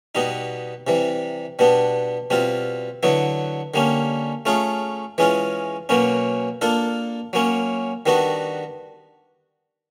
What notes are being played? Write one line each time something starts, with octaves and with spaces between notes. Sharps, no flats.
B2 G3 B3 D#4
C3 E3 G3
B2 G3 B3 D4
B2 G3 C4 F4
D3 F#3 B3 E4
D3 G3 A#3 C#4
A3 C#4 F4 G#4
E3 G#3 C#4 F4
B2 F#3 A#3 C#4
A#3 D4 F4 A4
F#3 A#3 C#4
D#3 G3 B3 D4 F#4